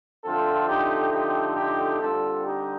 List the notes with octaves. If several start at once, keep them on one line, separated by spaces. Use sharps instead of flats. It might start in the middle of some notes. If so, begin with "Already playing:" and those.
F2 D3 A3 C4 F4 A4
D#4 G4
D#4 G4
D#4 G4
D3 G3 C4 F4 A4
D#4 G4